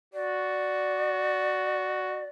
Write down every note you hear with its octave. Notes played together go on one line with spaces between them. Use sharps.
F#4 D5